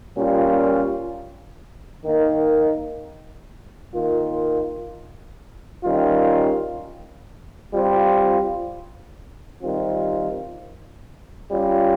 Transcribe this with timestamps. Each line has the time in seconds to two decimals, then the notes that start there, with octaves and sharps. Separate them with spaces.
0.16 A#2 G3 C#4 F4
2.05 D#3 A#3 D#4
3.94 D#3 A#3 F4
5.84 D#3 G3 C#4 F4
7.73 G3 C4 F4
9.62 D#3 G3 C4 F4
11.51 G3 C#4 F4